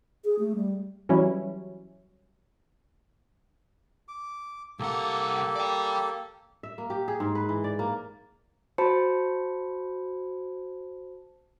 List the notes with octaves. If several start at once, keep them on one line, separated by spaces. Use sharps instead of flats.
G#4
A3
G3
E3 F#3 G3 C#4 E4
D6
C2 A#3 G4 A4 F#5
D5 G5
E5
A#3
G4
G#4
G#2
B4
E3
D5
A#3
F#4 C5 A5 B5 C#7